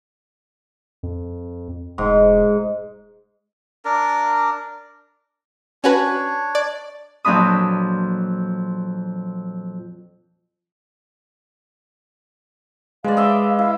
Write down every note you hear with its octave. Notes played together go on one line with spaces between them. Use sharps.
F2
E1 G#2
D4 A#4
C#4 D4 F#4 B4 C#5
D5
F2 A#2 F#3 D4 B5 D#6
G#3 B4 D5 F5
D#5 E5 D6
E4 F5